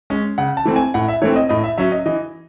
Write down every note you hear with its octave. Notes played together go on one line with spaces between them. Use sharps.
G#3 C#4
C#3 F#5
A5
E3 A3 C4
G#5
A2 F#5
E5
E3 A3 C4 C#5
D#5
A2 D#5
E5
F#3 C#4 E5
D#5
E3 D#5